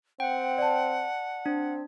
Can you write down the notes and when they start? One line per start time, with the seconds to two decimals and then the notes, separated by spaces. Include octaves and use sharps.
0.20 C4 F#5 G5
0.58 D5 A5
1.46 C4 D4